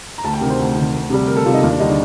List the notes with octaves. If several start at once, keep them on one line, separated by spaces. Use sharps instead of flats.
A#5
D2 A5
G5
C3 D#3 A#4
C5
D2
C3 D#3
D2
C3 G3
D2 A#4
A4
C3 G3 F4
D#4
D#2 F4
D4
D3 G3 D#4
D4